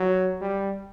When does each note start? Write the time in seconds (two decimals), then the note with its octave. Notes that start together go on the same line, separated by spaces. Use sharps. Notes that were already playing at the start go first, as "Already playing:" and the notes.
Already playing: F#3
0.41 G3